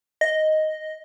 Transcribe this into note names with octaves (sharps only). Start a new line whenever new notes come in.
D#5